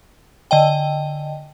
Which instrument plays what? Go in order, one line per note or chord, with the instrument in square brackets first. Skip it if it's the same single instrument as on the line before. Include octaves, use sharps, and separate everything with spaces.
[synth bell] D3 D#5 G5